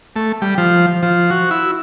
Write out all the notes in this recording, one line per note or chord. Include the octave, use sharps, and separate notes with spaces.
A3
G3
F3
F3
F#4
E4